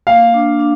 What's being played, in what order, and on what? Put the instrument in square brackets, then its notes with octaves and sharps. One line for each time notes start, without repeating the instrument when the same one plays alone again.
[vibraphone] A#3 [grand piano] F5
[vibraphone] D4
D4